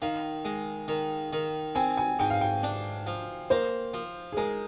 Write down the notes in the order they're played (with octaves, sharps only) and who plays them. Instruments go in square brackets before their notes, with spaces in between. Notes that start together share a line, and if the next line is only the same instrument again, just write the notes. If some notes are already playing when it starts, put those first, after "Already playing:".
[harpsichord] D#3 [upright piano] F5
[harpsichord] G#3
D#3
D#3
[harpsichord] C4 [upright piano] G#5
[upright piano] G#5
[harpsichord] G#2 [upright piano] G5
[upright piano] F5
G5
[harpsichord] D4
F3
[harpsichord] A#3 [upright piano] C5
[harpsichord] F3
[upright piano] G#4
[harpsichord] G#3 [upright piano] A#4